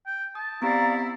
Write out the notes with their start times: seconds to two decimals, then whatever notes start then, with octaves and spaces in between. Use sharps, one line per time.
0.06 G5
0.35 A5 D#6
0.62 B3 C4 E4 G4 D5 F5 A#5